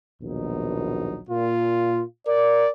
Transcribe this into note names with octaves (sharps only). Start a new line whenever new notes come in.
A#1 D#2 B2 F#3 D#4
A#2 F4
A#4 D5